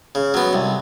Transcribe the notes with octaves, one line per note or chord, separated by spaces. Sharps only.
C#3
F#3 B3
C2